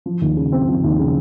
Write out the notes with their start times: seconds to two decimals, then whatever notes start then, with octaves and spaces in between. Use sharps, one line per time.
0.06 F3
0.22 D#2
0.37 C#3
0.52 C4
0.68 F3
0.84 D#2
0.99 C#3